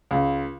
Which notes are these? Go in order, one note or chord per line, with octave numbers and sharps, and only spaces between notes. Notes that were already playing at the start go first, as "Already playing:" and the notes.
C#2